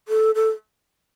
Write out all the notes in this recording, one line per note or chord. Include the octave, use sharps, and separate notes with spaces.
A4
A4